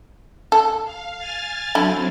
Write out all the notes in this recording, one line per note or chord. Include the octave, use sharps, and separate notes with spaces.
A4
F5
G#5 F6 A6
D3 F#3 C4 E4